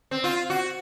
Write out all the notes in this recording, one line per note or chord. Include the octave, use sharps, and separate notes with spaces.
C4
F4
F#4